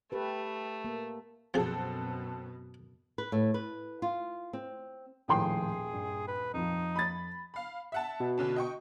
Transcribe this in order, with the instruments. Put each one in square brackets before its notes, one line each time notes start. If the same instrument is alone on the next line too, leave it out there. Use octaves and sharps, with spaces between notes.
[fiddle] A3 [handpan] G4 B4
[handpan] A#3
[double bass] F#2 B2 [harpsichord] F3 G#4 [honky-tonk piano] C4 F#4 A4
[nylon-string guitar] B4
A2
B4
F4
C4
[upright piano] D#1 G5 C6 [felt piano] A2 D#3 F3 [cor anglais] G#4
[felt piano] G2
[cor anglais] B4
[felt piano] F2 F3 [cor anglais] D#4
[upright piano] B5 A6
[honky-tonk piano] F5 B5
E5 F#5 A5
[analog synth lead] B2
[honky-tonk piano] D3 C#4 D4
D#5 G5 C#6